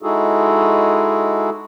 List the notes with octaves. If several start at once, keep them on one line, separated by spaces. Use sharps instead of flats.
G#3 D#4 E4 F#4 G#4 A4